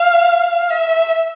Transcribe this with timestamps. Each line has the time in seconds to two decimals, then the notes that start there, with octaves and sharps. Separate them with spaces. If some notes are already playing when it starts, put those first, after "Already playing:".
Already playing: F5
0.71 E5